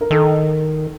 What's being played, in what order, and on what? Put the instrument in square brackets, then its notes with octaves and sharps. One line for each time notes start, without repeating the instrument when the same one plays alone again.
[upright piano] A#4
[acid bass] D#3 [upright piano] A4